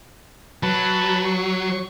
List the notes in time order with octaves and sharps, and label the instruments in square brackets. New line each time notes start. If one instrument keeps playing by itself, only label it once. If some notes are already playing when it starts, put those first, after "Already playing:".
[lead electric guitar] F#3 [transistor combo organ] B4 A5
[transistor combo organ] C#6